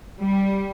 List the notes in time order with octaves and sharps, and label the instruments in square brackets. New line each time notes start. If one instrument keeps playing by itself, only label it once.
[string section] G3